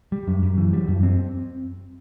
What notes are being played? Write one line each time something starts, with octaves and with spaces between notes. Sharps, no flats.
G3
F#2
F#2
E3
G3
F#2
C4